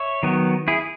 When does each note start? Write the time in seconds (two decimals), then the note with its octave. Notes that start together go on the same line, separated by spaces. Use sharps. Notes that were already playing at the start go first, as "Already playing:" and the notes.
Already playing: C#5 E5
0.23 D#3 F#3 B3
0.68 E4 G#4